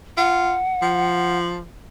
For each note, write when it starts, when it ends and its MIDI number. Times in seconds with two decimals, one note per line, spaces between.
0.17 0.56 65
0.17 1.38 78
0.82 1.63 53